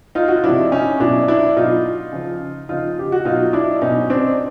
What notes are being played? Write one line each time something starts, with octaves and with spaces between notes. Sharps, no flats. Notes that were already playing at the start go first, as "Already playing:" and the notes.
D#4 F4
F#4
F4
C3 F3 D4 E4
C#4 D#4
B2 F#3 D4 E4
D4 E4
B2 F#3 D#4 F4
C#3 F3
C#3 F3 D#4 F4
G4
F#4
B2 F#3 D#4 F4
D4 E4
B2 F#3 C#4 D#4
C4 D4